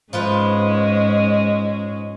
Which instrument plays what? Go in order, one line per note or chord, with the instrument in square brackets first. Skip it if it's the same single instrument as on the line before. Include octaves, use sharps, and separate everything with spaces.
[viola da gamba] G#2 G#3 C#4 [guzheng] F3 F4 B4